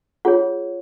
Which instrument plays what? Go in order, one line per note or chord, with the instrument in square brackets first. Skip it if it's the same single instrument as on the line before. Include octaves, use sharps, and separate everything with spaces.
[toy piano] F4 G#4 C#5 F#5